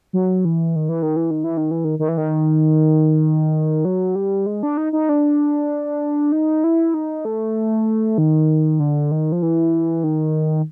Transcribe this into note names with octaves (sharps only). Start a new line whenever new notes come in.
F#3
E3
D#3
E3
D#3
E3
D#3
E3
D#3
E3
D#3
D#3
E3
D#3
F#3
G3
G#3
D4
D#4
D#4
D4
D#4
E4
D#4
A3
D#3
D3
D#3
F3
E3
D#3